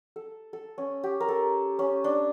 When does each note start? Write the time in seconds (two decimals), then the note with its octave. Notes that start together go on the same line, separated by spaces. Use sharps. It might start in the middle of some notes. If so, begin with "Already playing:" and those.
0.16 A4
0.53 A4
0.78 C#4
1.04 G4
1.20 A#4
1.28 A4
1.79 C#4
2.04 D4